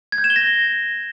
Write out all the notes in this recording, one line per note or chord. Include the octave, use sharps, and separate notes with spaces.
G#6
G6
E7
G7
A#6